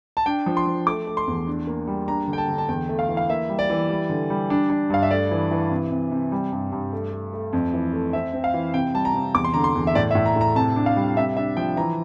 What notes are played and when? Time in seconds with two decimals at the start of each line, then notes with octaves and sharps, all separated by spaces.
0.17 A5
0.26 D4 G5
0.46 F3
0.57 C6
0.66 F3
0.87 A3 D6
1.07 A3
1.17 C6
1.27 E2
1.47 D4
1.67 A#3
1.87 G3
2.08 D4 A#5
2.28 D3
2.33 G5
2.38 A5
2.48 D3
2.58 A5
2.69 E2 G5
2.89 A3
2.99 F5
3.08 E3
3.17 F5
3.29 A#3 E5
3.49 G3
3.59 D5
3.69 E3
3.89 G3
4.09 D3
4.30 G3
4.50 D4
4.70 D4
4.90 G2 F5
5.03 E5
5.11 A3 D5
5.31 E3
5.51 E3
5.71 C3
5.91 C3
6.11 C3
6.32 G3
6.52 G2
6.72 G2
6.93 A3
7.12 A3
7.33 A3
7.53 F2
7.73 E3
7.93 A3
8.13 C4 E5
8.33 C4
8.44 F5
8.54 E3
8.74 C3 G5
8.94 G3 A5
9.05 A#5
9.14 C3
9.35 E2 D6
9.44 C6
9.54 D3 A#5
9.64 C6
9.75 E2
9.87 E5
9.95 A2 D5
10.11 E5
10.15 A2
10.26 A#5
10.36 A2
10.41 A#5
10.56 C3 A5
10.76 D4
10.86 F5
10.96 G3
11.17 C3 E5
11.37 D4 E5
11.57 F3 G5
11.77 E3 A#5